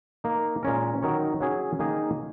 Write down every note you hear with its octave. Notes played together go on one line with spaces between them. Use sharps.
A#3 D#4 A#4
A#2 G#3 C#4 A#4
D#3 F#3 D#4 A#4 C#5
F#3 C#4 G#4
D#3 A#3 D#4 G#4